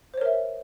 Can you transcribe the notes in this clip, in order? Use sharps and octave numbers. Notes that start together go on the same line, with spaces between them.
A#4 C5 C#5 E5